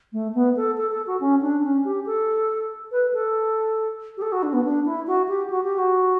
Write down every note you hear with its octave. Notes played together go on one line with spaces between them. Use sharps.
A3
B3
A4
A4
A4
F#4
C#4
D4
C#4
G4
A4
B4
A4
G4
A4
F#4
D4
B3
D4
E4
F#4
G4
F#4
G4
F#4